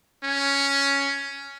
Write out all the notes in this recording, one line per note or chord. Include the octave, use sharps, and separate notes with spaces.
C#4